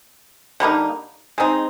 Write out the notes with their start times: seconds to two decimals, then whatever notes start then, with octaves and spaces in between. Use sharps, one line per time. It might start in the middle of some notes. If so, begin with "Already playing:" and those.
0.60 D3 G3 A#3 D#4
1.38 G#3 C4 D#4